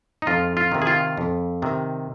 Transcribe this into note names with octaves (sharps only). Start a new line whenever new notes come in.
D#4
F2 F4
F4
C3 D#3
G#4
F4
F2
C3 D#3